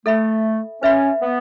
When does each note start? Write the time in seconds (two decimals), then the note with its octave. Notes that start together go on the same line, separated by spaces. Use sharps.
0.06 A3 A4 E5 B5
0.82 C#4 B4 E5 B5
1.22 B3